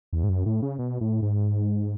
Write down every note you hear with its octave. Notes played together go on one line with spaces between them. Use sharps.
E2
G#2
F#2
A2
C#3
B2
A2
G#2